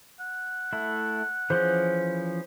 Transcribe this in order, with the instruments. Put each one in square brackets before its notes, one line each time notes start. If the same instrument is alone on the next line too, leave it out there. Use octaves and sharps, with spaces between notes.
[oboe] F#5
[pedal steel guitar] A3 E4
[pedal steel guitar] E3 F3 C#4 [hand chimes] G#4 C5 G6